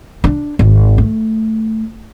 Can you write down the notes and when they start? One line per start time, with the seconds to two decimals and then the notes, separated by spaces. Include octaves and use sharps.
0.24 D4
0.59 G#1
0.98 A3